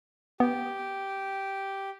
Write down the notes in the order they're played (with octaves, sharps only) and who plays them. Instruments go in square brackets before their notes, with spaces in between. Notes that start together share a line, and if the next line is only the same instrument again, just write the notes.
[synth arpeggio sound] B3 [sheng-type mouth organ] G4